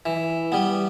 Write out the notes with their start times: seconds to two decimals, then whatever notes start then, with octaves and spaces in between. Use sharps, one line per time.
0.06 E3
0.52 G3 B3